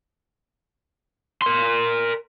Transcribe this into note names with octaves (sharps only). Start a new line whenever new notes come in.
A#4 C6